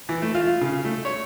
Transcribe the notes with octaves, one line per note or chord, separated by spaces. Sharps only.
E3
A3
F4
C#3
A3
C#5